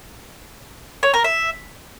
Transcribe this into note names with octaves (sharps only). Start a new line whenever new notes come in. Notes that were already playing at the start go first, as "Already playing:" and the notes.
C#5
A#4
E5